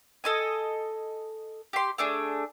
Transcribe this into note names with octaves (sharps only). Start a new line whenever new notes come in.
A4 D#5 G#5
G4 C6
A3 D4 G#4